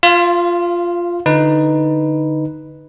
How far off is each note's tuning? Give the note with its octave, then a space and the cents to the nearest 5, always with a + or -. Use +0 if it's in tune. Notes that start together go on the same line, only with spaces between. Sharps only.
F4 +0 F5 -30
D3 +0 D#4 +0 B4 +0